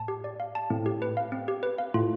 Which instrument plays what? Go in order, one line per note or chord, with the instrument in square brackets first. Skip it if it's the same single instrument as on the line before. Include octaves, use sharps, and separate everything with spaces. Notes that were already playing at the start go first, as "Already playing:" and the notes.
Already playing: [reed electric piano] A2 [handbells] A5
[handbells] G4
D5
F5
A5
[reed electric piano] A2 [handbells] C4
[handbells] G4
B4
F5
C4
G4
B4
F5
[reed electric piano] A2 [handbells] F4